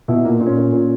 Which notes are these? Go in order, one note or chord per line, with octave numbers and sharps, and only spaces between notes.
B2 E4
A#2 A#3
A#2
C#4
A#2
A#2